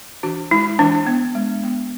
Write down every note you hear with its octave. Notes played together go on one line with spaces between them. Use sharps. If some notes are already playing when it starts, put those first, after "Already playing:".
E3 D4 F#4
G#3 E4
E3 D4
B3
G#3
B3